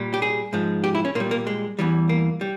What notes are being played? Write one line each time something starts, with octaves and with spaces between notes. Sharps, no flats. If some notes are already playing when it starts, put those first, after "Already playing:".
Already playing: A#2 G3
G4
G#4
G#2 F3 G#3
G4
E4
C#4
A#2 G3 A#3
A#3
G#3
E2 E3 G3
A#3
G3